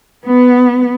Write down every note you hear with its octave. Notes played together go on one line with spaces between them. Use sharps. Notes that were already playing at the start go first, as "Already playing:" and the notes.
B3